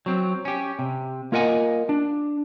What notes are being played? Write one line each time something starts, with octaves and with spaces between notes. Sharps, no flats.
F#3 C4
C#4 G4
C3
A#3 F4 A#4 D#5 F#5 G#5
D4